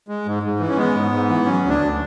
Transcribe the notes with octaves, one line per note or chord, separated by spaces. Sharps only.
G#3
G#2
G#2
E3
C#4
G#3 B3
G#2
G#2
E3
F#3 C#4
D2
D4
D2